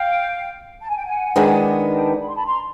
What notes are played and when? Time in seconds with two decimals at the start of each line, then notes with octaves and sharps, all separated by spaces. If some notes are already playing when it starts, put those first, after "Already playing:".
Already playing: F5 G5
0.81 A5
0.89 G#5
0.97 G5
1.04 F#5 G#5
1.36 D#3 G#3 B3 D4
1.91 G5 A5
2.19 B5
2.27 C6
2.34 A5 B5
2.46 A#5 C6